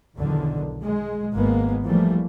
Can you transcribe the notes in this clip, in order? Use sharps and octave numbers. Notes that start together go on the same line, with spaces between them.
B1 E2 D3 D#3
G#3
G#1 G#2 G#3 A#3 B3
E3 F3 G3 A3 A#3